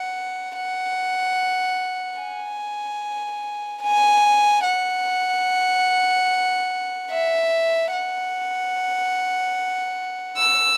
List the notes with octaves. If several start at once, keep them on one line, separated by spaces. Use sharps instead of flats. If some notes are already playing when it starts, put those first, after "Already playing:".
Already playing: F#5
F#5
G#5
G#5
F#5
E5
F#5
E6